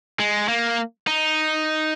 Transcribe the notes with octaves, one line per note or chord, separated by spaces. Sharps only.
G#3
A#3
D#4